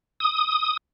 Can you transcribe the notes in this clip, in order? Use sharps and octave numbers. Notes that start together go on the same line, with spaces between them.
D#6